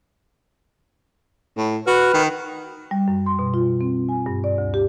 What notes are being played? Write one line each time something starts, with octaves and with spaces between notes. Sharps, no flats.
A2
F#4 B4 F6
D#3
G3
F#2
C6
B2
F4
C4
G#5
G2
D5
D2
G4